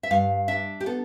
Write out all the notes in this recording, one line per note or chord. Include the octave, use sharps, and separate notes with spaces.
E5
G2 F5
D4 E5
G4
B3 A4